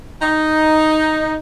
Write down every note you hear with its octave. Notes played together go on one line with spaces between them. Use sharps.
D#4